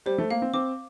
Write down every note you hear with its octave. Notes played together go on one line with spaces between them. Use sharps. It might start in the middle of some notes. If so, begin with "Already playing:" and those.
G3 C5
A3
A#3 F5
C4
C4 D6